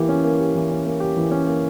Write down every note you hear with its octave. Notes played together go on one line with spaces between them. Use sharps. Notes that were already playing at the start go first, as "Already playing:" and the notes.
Already playing: E3 A#3 G4
C#4
A#3
G4
E3
C#4
A#3
G4
E3
C#4
A#3